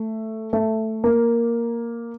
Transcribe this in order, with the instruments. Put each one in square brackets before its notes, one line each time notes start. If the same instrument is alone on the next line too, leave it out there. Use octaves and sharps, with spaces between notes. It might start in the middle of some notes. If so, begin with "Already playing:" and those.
Already playing: [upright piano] A3
A3
A#3